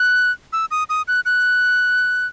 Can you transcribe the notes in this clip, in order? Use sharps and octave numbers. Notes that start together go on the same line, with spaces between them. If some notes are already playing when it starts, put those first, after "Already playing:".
Already playing: F#6
E6
D#6
D#6
F#6
F#6